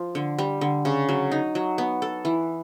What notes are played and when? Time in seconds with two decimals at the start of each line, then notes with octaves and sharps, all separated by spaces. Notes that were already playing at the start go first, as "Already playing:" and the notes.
Already playing: F3
0.15 D3
0.39 G3
0.61 D3
0.85 C#3
1.09 F#3
1.32 D#4
1.55 F#3
1.78 B3
2.02 A4
2.25 E3